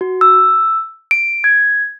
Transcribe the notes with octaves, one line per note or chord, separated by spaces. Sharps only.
F#4
E6
D7
G#6